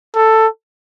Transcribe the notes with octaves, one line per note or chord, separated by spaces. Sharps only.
A4